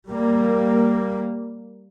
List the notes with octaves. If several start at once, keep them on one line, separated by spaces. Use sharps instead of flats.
G3 A#3